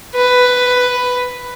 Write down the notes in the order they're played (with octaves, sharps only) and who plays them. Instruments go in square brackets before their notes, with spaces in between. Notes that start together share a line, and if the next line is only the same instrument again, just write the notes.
[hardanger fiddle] B4